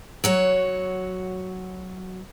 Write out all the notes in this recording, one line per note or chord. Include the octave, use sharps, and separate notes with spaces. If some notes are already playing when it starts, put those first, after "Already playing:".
F#3 F#4 C#5